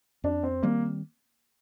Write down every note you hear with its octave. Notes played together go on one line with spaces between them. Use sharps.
F2 D4
C4
D#3 G3 A#3 C4